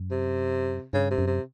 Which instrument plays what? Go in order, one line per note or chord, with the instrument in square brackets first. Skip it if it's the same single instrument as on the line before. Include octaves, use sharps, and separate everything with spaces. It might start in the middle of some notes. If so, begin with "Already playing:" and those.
Already playing: [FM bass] F#2
[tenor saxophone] C3
[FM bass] G2 [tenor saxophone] C#3
[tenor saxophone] C3
[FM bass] F#2
[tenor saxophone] C3